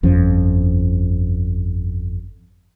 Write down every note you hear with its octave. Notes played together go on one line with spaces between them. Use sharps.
G1 F2 F3 C#4